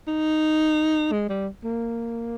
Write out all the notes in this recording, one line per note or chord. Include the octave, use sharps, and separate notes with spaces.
D#4
G#3
G3
A#3